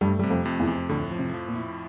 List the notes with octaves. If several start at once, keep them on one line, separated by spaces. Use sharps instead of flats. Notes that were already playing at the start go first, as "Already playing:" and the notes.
G2 G3 A3
C3 G3
F2 F3
F2
E2 E3
F2
D2 A2 D3
F3
C3
F3
A#2
E4